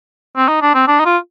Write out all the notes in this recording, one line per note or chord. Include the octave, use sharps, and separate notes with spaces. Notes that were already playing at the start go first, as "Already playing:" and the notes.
C4
D#4
D4
C4
D4
D#4
F4